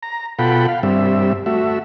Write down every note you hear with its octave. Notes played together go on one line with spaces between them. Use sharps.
A#5
B2 F4 A4 F#5 G5 B5
F5
G2 G3 C4 E5
A3 F#4 E5